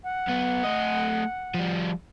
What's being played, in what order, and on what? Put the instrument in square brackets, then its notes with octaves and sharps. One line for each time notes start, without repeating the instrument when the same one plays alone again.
[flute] F#5
[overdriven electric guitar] B1 B3
A3 D#5
F3 G3